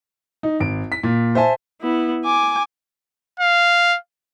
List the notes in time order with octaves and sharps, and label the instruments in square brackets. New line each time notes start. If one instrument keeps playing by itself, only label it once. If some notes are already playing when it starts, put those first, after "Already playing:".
[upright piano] D#4
G#1 D7
B6
A#2
C5 E5 G#5 A5
[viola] B3 E4
G#5 D6
[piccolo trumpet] F5